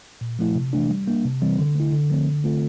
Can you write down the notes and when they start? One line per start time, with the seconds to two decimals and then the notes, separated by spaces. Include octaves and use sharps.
0.21 A#2
0.39 F3 A3 E4
0.55 C3
0.73 E3 A3 D4
0.89 G3
1.08 A#3 D4
1.25 C3
1.42 E3 G3 C4
1.58 D3
1.75 A3 E4
1.92 D3
2.10 F3 A3 C4
2.27 D3
2.44 A3 C4 F4 A4